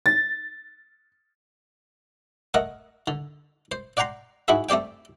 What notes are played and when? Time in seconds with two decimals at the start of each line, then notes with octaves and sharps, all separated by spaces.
0.06 A6
2.54 A3 A#4 D#5 F#5
3.08 D3
3.72 C5
3.97 D5 F#5 G5 A#5 C6
4.48 G#2 E4 F#4 G#4 E5
4.69 A3 C4 G4 D5 G5